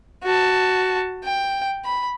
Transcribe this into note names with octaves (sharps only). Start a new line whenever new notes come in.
F#4 A5
G5
B5